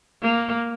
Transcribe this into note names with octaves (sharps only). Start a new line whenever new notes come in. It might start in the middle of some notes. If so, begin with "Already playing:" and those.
A#3